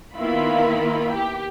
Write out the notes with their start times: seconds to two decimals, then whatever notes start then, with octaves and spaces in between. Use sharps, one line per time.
0.15 D#3 A#3 B3 E4 F4 B5
1.11 G4